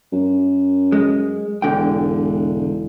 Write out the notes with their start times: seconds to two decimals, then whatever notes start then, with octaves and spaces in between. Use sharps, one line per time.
0.12 F#2
0.92 G#3
1.62 E1 G#2 D3 G5